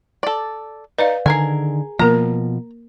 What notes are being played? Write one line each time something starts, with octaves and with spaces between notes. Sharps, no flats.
A4 D5
D#4 B4 D5 F5
D3 D#3 G#4 A#4 G#5
B2 F3 A#3 A#4 A#5